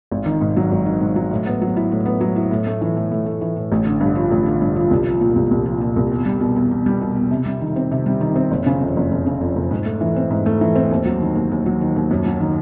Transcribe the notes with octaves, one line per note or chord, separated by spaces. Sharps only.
G#1
D#3
G#2
F#3
G#1
D#3
G#2
F#3
A2
B3
F#3
E4
A2
B3
F#3
E4
A2
A3
E3
A2
A2
A3
E3
A2
A1
D3
G2
F3
A1
D3
G2
F3
C2
F3
A#2
C2
C2
F3
A#2
C2
E2
G3
B2
E2
E2
G3
B2
E2
C3
G3
D#3
C4
C3
G3
D#3
C4
F#1
C#3
F2
F#1
F#1
C#3
F2
F#1
G#2
A3
E3
C4
G#2
A3
E3
C4
D#2
F#3
D#3
D#2
D#2
F#3
D#3
D#2
F#2
F#3
D#3